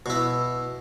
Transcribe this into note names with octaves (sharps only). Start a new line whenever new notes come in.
B2 E4